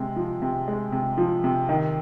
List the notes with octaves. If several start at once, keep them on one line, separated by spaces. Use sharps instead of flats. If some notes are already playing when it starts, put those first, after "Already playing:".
Already playing: C3 G#3
F3
C3
G#3
C3
F3
C3
D#3